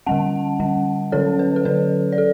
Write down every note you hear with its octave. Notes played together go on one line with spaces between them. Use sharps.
D3 G3 C#4 F#5 A5
D3 G3 C#4
D3 F#3 C#4 A4 C#5
B4
A4
D3 F#3 C#4 B4
D5
A4